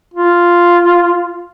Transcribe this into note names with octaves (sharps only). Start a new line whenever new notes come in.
F4